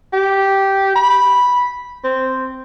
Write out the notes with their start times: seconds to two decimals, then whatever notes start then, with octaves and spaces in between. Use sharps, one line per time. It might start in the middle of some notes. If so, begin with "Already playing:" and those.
0.13 G4
0.96 B5
2.04 C4